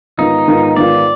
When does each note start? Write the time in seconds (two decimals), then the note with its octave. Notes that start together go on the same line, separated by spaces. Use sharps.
0.18 G#2 D#3 B3 D#4 F4
0.48 G#2 D#3 B3 F4
0.76 G#2 D#3 B3 F4 D5